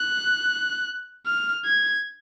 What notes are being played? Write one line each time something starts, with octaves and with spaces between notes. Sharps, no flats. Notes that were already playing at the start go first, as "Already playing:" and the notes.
Already playing: F#6
F6
G#6